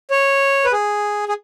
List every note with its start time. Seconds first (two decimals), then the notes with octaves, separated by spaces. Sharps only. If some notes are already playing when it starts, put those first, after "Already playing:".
0.10 C#5
0.65 B4
0.72 G#4
1.29 G#4